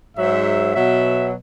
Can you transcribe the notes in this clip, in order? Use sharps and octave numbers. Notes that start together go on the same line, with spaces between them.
G#2 F#3 E5
B2 F#3 E5